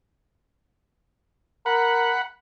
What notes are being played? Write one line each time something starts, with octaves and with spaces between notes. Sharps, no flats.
A#4 F#5 B5